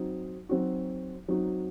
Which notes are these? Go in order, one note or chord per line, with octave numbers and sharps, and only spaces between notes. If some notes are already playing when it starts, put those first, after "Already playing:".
Already playing: F#3 C4 D#4 F#4
F#3 C4 D#4 F#4
F#3 C4 D#4 F#4